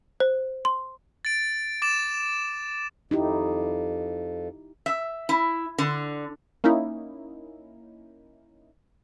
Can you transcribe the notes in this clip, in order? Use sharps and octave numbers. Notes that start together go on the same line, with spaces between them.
C5
C6
A6 D7
D6 A6 E7
F2 D#4 E4 G4
E5
E4
D3
A#3 C#4 D#4 E4